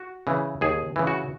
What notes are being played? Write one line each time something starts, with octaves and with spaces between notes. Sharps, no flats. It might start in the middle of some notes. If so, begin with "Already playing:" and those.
Already playing: F#4
C#3 E3
D#2 G#4
C#3 E3
F#4